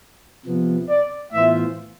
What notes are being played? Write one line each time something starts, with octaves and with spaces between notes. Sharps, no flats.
C3 F3 B3
D5
A2 E3 B3 F4 C5 E5